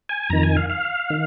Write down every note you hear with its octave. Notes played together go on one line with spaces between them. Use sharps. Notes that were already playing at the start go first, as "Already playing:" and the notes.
G#5
F2 D#3 A#5
G#5
F5
F5
D#3